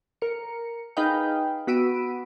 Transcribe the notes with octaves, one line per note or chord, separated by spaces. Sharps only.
A#4 C#7
D#4 G#4 B4 D#5 F5 G5
B3 F#4 B5 E6 D7 D#7